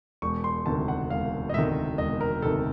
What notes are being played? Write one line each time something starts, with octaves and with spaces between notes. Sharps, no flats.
E1 C#6
C6
D2 C3 D#3 A5
F#5
E1 F5
D#5
D2 C3 D#3 E5
E1 D#5
A#4
D2 C3 D#3 A4